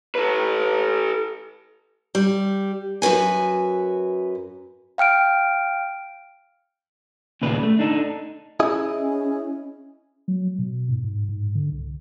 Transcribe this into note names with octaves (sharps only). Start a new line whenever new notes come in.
A4 B4
G3
F#2 F#4 B4 G#5
F5 G5 F6 D7
D#2 A#2 C#3 B4 D5
A3
D4 D#4 A4
C#4 E4 G#4 D#5
F#3
B2
G#2
G#2
G#2
D3
C2